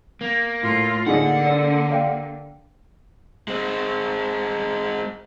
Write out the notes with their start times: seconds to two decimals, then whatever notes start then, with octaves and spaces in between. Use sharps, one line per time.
0.21 A#3
0.62 A2 F4
1.07 D3 A#3 D#4 G#4 D5 F#5
1.46 D5 E6
1.90 D5 F5 G5
3.48 G#3 C4